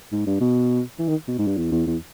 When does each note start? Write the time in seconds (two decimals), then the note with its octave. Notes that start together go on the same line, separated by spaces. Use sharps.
0.12 G#2
0.27 G2
0.41 B2
0.99 E3
1.08 D#3
1.28 B2
1.39 G#2
1.47 G2
1.57 E2
1.72 E2
1.87 E2